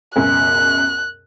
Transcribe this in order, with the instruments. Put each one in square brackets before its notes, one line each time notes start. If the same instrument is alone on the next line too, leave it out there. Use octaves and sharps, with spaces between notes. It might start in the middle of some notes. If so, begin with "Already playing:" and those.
[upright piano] C#2 F#2 B2 [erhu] F#6